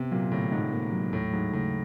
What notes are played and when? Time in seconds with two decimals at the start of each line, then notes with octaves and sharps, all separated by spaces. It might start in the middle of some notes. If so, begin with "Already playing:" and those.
Already playing: C3 B3
0.12 A#2 F#3
0.32 A2 D3
0.52 G#2 D#4
0.72 A#3
0.92 F#3
1.13 D#2 A2
1.33 G#2 F#3
1.53 A2 C#3